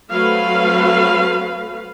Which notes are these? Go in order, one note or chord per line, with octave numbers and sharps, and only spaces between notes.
F#3 A3 C4 A4 B4 F5